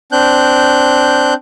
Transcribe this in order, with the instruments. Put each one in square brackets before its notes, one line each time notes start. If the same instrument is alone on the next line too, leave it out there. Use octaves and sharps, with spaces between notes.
[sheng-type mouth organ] C4 D4 F#6 G6